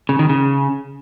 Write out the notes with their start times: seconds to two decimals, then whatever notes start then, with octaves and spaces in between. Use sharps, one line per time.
0.09 C#3
0.19 D#3
0.29 C#3